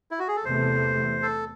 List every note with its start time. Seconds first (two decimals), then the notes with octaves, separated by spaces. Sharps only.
0.11 E4
0.19 F#4
0.28 G#4
0.36 A4
0.45 E2 C3 E3 A3 C5
1.23 A4